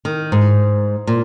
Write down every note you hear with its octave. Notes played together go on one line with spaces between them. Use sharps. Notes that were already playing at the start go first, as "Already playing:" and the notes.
D#3
G#2
A#2